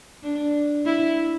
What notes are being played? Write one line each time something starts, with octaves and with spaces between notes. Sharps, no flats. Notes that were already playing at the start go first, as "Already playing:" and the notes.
D4
E4